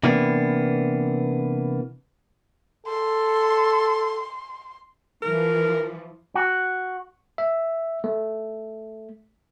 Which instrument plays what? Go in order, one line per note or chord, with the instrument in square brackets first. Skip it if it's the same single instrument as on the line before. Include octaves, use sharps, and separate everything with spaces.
[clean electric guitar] C3 E3 A#3 B3 D4
[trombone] A4 [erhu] C6
[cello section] E3 F3 [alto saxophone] A#4
[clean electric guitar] F#4
[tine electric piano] E5
A3